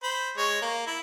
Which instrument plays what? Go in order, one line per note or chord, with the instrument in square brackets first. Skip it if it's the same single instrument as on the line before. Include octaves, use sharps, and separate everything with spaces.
[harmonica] C5 B5
G#3 C#5
A#3
E4